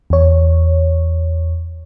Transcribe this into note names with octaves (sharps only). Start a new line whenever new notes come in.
E2 C#5